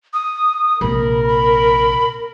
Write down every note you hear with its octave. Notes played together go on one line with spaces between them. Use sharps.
D#6
A#1 C3 A#4 B5
B5